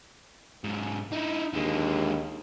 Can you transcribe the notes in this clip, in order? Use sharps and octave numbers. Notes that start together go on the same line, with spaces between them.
G#2 F#3
D#4 E4
D#2 D3 G#3